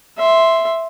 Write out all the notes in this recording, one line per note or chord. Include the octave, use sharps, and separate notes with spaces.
E5 C6